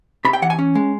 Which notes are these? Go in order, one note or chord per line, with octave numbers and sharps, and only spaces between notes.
C3 B5
G5
E3 F#5
G#5
C#4
G#3